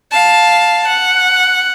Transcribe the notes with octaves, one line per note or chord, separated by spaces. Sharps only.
F5 A5
F#5